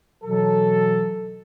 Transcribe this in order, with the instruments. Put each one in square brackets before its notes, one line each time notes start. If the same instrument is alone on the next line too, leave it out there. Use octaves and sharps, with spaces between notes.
[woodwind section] B2 E3 F#3 [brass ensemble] A4